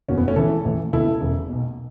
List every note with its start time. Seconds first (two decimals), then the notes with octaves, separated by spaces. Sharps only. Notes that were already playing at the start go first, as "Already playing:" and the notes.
0.08 F#1 E2 B2 C#4 F#4
0.18 B3
0.28 A3 C#4
0.36 C#2 C#3 E3 E4 A4
0.65 A1 A2 E3
0.93 C#2 B2 E4 A4
1.21 E1 E2 C#3
1.49 B1 B2